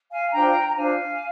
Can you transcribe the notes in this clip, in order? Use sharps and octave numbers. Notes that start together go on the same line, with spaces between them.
F5 G#5
D4 F4 C5 G5 A#5
A#5
D4 F4 C5 F5 G#5